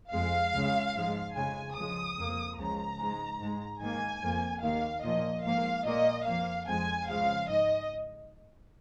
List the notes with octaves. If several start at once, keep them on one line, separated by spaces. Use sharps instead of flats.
F2 F3 G#3 F5
C#2 C#3 G#3
G#2 F3 G#3
F2 C#3 G#3 G#5
C#2 C#3 F3 G#3 D#6
F2 F3 A#3
C#2 C#3 F3 G#3 A#5
G#2 G#3
G#2 G#3
G#2 D#3 A#3 G#5
F2 F3 A#3
D#2 D#3 A#3 F5
A#2 F3 A#3 D#5
G#2 F3 A#3 F5
A#2 A#3 D#5
F2 F3 A#3 F5
F2 F3 G#3 G#5
C#2 C#3 F3 G#3 F5
G#2 D#5